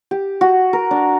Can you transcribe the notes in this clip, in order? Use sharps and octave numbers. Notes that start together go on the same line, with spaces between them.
G4
F#4
A#4
D4